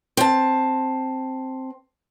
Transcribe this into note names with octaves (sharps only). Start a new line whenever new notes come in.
C4 A5